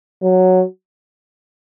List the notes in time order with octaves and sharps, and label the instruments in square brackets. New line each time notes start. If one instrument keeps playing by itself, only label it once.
[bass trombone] F#3